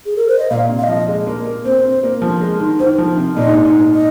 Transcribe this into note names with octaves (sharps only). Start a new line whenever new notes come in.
G#4
A#4
C5
D#5
A#2 F5
C3
F5
D#5
F3
G#3
A#3
A#3
C4 C5
C4
A#3
F3
G#3
D#3
D#3 C5
F3
C3
A#2 D#5
G#2
G#2
D#5